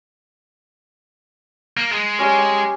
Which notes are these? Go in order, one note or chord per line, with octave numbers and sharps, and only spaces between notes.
A#3
G#3
C#4 G4 D5
G5